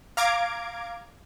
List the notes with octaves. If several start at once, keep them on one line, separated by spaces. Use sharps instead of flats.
F5 A#5 D6 G#6 D7